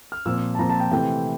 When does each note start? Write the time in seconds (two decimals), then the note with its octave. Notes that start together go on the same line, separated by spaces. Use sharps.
0.12 F6
0.26 A#2 F3 C4 E6
0.55 A5
0.59 A#2 F3 C4 A#5
0.69 A5
0.80 G5
0.91 C3 E3 A3 C4 G5